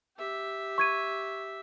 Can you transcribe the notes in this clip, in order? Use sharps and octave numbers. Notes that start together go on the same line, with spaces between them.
G4 E5
C#6 G#6 D#7